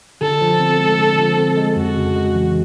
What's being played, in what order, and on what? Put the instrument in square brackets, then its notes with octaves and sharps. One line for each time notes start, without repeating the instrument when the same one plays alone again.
[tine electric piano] D3 [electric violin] A4
[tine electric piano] F3
C4
G#3
D3
F3
C4
G#3
[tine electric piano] F2 [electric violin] F#4
[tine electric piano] C#3
G#3
E3